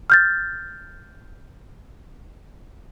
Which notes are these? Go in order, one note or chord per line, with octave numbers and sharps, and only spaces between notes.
F6 G6 A6